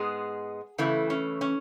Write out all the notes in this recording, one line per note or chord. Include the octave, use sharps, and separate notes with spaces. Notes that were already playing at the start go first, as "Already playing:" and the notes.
Already playing: G#2 G#3 B3 G#4
C#3 E3 A3 E4
C#4
C#4